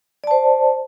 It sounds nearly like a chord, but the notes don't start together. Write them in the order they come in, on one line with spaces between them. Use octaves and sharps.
D5 A5 C5